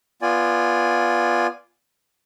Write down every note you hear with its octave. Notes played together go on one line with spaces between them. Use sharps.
B3 F4 D5 G#5